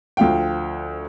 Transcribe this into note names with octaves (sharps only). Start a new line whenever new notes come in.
D2 F3 F5 G5